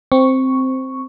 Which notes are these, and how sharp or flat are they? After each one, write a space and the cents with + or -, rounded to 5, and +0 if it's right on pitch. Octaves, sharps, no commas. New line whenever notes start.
C4 +0 C#6 +0